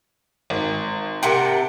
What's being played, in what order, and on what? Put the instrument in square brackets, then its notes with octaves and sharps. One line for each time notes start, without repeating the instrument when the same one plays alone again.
[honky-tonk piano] G#1
[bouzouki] C3 F#5 A5 [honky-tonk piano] A#4 G5